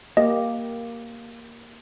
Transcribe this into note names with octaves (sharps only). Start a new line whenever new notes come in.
A#3 G4 D#5